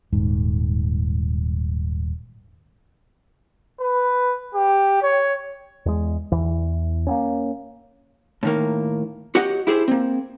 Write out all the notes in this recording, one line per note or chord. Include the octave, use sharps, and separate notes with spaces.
D#1 G#2
B4
G4
C#5
E2 G#3
E2 E3
A#3 B3 C#4
A2 D#3 A#3
F#4 G4 C#5 D#5 F#5
E4 G4 G#4 C5
A#3 C4